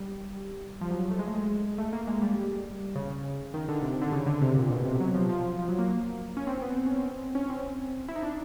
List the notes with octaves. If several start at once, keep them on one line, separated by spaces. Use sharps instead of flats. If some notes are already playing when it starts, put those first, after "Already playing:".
Already playing: G3
F3
F#3
A3
G#3
A3
G#3
A3
A#3
G#3
G3
C#3
D#3
D3
C3
D3
C#3
D3
C3
A#2
B2
C3
F#3
F3
F3
F3
F3
F#3
A#3
C#4
C4
B3
C4
C#4
C4
C#4
C4
E4
D#4
D4